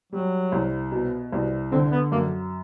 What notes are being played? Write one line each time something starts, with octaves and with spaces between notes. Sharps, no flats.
F#3 G3
C2
B2
C2
D3 C4
B3
F#2 A#3